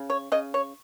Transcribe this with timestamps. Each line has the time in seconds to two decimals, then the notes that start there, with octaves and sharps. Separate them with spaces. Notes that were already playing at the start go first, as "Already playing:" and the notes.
Already playing: C#3
0.10 C#5
0.32 C#3 D#5
0.54 C#5